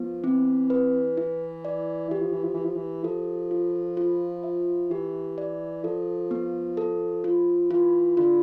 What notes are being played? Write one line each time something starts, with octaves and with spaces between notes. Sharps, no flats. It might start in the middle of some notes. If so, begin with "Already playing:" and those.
Already playing: F3 B3
E3 C4
B4
E4
D5
E3 G4
F3
E3
F3
E3 G4
F3
E3
F3 A4
F4
F4
E5
E3 G4
D5
F3 A4
B3
A4
F4
E3 F4
D3 F4